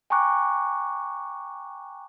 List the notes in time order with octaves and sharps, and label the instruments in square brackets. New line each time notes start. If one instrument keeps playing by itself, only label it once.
[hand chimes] G5 G#5 A#5 C#6 D6 F#6